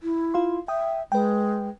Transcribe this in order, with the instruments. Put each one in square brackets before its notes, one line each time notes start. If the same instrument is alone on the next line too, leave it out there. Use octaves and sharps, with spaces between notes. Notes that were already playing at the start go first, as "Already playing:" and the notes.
[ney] E4
[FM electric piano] F4 F5 C6
[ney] E5 [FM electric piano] G5 D#6
[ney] G#3 [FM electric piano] B4 G5